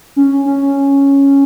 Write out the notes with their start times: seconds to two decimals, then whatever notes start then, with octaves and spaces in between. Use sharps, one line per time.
0.16 C#4
0.46 C#4